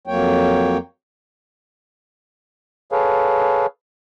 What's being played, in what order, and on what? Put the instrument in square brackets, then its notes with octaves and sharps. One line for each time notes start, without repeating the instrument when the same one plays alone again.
[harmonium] F2 F#3 A#3 C#5 G5
[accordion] G#4 A4 B4 C#5 F5